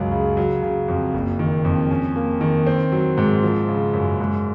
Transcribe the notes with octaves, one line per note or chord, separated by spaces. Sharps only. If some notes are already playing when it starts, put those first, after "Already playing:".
Already playing: C#2 F#2 F#3
C#3
F#3
C#3
F2
F#1
D#3
F2
C#4
A#3
D#3
C4
F#3
G#2
F3
C#3
F#2
G#2